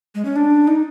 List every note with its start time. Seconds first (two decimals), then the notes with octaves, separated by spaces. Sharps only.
0.15 G#3
0.25 C#4
0.36 D4
0.67 D#4